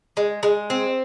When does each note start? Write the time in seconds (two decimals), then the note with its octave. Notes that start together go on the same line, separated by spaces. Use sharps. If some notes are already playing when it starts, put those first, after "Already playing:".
0.17 G#3
0.43 G#3
0.70 C4